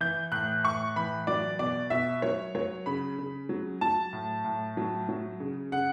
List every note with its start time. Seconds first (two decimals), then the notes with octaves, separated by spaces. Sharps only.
0.01 E3 G6
0.32 A2 F#6
0.64 A2 C#6
0.96 E3 B5
1.27 F#3 D5
1.59 B2 D5
1.90 B2 E5
2.22 F#3 C#5
2.55 F#3 C#5
2.86 C#3 B5
3.18 C#3
3.49 F#3
3.81 F#3 A5
4.13 A2
4.44 A2
4.77 F#3
5.09 F#3
5.40 C#3
5.72 C#3 F#5